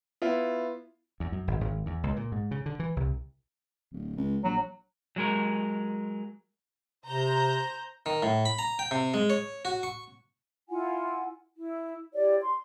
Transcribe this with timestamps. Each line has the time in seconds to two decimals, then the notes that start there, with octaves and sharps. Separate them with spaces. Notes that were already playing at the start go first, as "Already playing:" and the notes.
0.22 B3 E4 F4
1.20 E2
1.32 F#2
1.48 G#1
1.61 G#1
1.86 E2
2.03 C#2
2.16 A#2
2.32 G#2
2.51 C#3
2.66 D3
2.80 E3
2.96 C2
3.93 D1
4.17 C#2
4.44 A#1 F#3
5.16 F#3 G#3 A#4
7.06 C3 C5 A#5 G6
8.06 D#3
8.22 A2
8.45 B5
8.59 A#5
8.79 G5
8.91 C3
9.14 G#3
9.30 C#5
9.65 F#4
9.83 C#6
10.69 E4 F4 F#5 G#5
11.56 E4
12.15 E4 G4 C#5 D5
12.43 C6